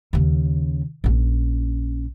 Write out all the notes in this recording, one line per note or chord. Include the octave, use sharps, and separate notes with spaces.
D#2 C#3
A#1 C#4